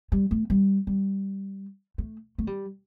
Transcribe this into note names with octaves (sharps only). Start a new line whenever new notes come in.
G3
A3
G3
G3
A3
A3
G3